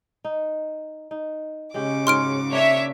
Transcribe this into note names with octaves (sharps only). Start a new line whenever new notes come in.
D#4
D#4
C#3 G#3 C#4 G4 D6
G#2 F#4 C#5 C6 F6 D7
A#3 D4 C#5 E5